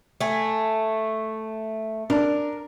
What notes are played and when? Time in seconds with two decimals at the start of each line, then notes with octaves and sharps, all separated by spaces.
0.21 A3 G#5
2.10 D4 A#4